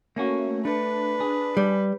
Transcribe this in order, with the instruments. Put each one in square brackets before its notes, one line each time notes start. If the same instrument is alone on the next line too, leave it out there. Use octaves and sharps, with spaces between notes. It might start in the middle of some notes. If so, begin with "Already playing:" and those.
[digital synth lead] A3 [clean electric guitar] A#3 C#4 F#4
[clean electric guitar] A3 [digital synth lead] D4 [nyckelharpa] B4
[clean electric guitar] G#4
[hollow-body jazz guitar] G3